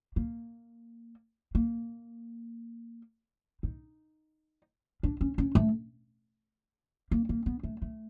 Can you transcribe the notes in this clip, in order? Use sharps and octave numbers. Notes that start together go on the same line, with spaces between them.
A#3
A#3
D#4
D4
C#4
C#4
A3
A#3
A#3
B3
A3
A3